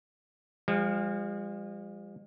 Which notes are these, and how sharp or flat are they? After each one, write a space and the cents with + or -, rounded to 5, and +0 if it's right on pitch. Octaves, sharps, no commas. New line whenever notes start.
F3 +0 G#3 -45